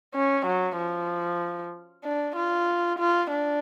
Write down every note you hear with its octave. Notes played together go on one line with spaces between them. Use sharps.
C#4
F#3
F3
D4
F4
F4
D4